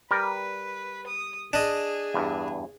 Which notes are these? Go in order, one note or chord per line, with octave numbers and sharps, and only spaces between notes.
G3 A#4 B4
D#6
D4 G#4 D#5
E2 G2